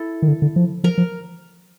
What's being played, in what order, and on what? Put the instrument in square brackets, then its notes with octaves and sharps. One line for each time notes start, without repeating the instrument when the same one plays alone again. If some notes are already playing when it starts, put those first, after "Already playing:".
Already playing: [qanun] E4 A4
[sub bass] D#3
D3
D3
F3
[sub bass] F3 [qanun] A#4
[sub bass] F3